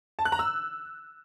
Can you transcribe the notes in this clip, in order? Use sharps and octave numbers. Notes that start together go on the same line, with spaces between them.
A5
F#6
A#5
E6